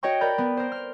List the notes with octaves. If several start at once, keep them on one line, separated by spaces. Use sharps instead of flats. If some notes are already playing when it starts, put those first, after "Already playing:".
F#4 C#5 D#5 G5 C#6
A#4 D5 B5 G6
B3
A#4 C5
F6